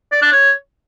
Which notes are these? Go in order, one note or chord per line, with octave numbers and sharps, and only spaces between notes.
D5
D4
C#5